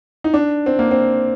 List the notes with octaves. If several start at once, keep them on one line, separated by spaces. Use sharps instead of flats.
D#4
D4
C4
A#3
C4